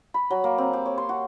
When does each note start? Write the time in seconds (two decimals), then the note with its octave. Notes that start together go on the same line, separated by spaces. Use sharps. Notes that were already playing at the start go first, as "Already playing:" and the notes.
0.14 B5
0.30 F#3
0.44 A#3
0.58 C4
0.73 G4
0.86 C#5
0.98 C6
1.09 F#4